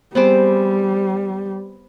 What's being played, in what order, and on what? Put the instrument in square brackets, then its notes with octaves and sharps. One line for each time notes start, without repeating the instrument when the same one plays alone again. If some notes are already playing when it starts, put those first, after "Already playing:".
[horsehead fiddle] G3 [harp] B3 C5 [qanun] C4 G#4 D6